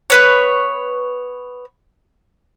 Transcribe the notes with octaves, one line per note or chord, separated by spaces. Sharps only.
B3 B4 C#5